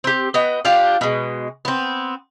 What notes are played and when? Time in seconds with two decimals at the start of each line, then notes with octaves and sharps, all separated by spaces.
0.04 C4 G4
0.34 B3 F#4 D#5 G5
0.65 D4 F4 G4
1.01 B2 G#3
1.65 B3 C4